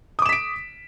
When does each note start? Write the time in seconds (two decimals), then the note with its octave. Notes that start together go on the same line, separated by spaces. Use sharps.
0.19 D#6
0.22 D6
0.26 E7
0.29 B6
0.32 D7